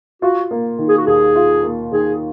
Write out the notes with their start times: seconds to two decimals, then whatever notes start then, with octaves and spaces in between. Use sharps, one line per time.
0.22 F4 F#4
0.51 A#3
0.79 D#3
0.88 G#4
0.96 F#4
1.06 D#2 G#4
1.35 F4
1.63 A#3
1.92 D#3 G#4